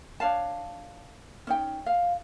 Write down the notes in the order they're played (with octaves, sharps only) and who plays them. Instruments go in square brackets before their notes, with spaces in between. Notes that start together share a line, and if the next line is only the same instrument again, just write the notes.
[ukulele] D4 C#5 F5 A5
C#4 D#4 G5
F5